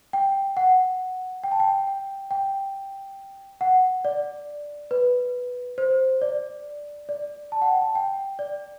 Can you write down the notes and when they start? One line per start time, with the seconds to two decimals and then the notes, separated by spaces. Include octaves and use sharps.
0.13 G5
0.57 F#5
1.44 G5
1.52 A5
1.60 G5
1.87 G5
2.31 G5
3.61 F#5
4.05 D5
4.91 B4
5.78 C5
6.22 D5
7.09 D5
7.52 A5
7.62 F#5
7.66 G5
7.81 A5
7.95 G5
8.39 D5